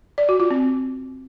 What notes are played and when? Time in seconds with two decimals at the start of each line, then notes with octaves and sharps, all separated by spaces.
0.18 D5
0.29 F#4
0.40 F4
0.51 C4